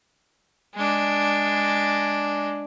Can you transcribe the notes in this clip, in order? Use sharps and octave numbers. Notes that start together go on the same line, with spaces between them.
G#3 D4